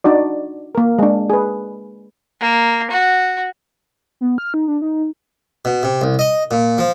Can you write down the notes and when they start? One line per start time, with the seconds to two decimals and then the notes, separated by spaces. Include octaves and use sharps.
0.04 D4 D#4 F#4 D5
0.75 A#3 A#4
0.99 G#3 D4
1.30 G#4 B4
2.40 A#3
2.90 F#4
4.21 B3
4.38 F6
4.54 D#4
4.68 D4
4.82 D#4
5.65 B2
5.83 C3
6.01 C2
6.19 D#5
6.51 A#2
6.78 F3